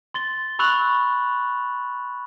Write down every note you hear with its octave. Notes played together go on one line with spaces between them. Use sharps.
C6 A6 G7
B5 C#6 E6 F#6 F7 F#7